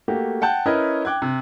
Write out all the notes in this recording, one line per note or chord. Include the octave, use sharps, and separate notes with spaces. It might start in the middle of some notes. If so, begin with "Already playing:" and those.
A3 A#3 F#4 G4
F#5 G5 A5 G6
C#4 E4 A#4 B4 C#5 D#5
G5 D6 F#6 G#6
C3